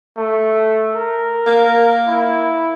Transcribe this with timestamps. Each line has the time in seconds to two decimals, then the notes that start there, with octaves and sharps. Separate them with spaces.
0.17 A3
0.96 A#4
1.47 A#3
2.08 E4